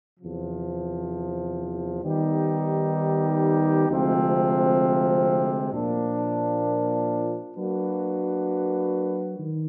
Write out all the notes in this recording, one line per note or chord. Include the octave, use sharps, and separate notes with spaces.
E2 C3 F3
D#3 G3 B3 D#4 G4
D2 C3 F3 G#3 C4
A#2 F3 A#3 D4
F#3 A#3 D4 F#4 B4
D#3